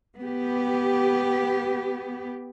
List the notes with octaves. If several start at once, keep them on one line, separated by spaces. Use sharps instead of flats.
B3 G4